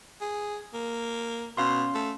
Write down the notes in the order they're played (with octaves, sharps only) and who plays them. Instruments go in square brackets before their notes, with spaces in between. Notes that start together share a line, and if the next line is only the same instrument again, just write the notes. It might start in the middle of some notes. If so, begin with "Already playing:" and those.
[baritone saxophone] G#4
A#3
[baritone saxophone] B2 [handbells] C#4 F5 C6
[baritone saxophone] A3